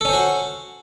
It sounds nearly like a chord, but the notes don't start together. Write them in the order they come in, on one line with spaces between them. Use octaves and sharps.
A4 C#4 C5 F#4